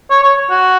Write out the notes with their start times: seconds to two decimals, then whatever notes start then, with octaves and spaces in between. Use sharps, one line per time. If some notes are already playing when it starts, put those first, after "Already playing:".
0.10 C#5
0.23 C#5
0.50 F#4